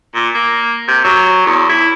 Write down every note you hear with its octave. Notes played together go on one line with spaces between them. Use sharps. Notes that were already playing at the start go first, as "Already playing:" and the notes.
A#2
A#3
C3
F#3
E2
E4